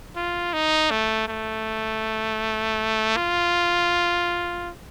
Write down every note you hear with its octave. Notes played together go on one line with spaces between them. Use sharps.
F4
D#4
A3
A3
F4